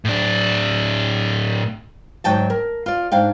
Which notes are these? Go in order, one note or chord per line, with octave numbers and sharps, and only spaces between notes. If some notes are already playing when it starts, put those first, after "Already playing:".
A2 D4
D2 G#2 F#3 D#4 G5 A5
A#4
F4 D5
G#2 D4 F5 G5